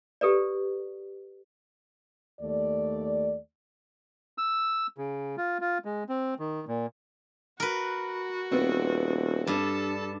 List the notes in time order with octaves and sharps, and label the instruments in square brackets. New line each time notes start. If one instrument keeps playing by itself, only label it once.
[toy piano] G4 A4 B4 D5
[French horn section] D#2 A3 D5
[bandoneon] E6
C#3
F4
F4
G#3
C4
D#3
A#2
[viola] F#4 [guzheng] A#4 B4
[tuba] D#1 [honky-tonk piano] B3 C4
[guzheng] G2 [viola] A4 A5